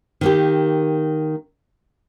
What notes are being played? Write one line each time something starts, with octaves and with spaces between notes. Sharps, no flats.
D#3 A#3 G4